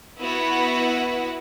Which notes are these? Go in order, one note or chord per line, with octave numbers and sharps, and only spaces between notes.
B3 E4 F#4 B4 F#5